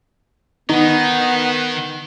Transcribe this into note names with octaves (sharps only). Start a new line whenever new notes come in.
D#3 B3 D#4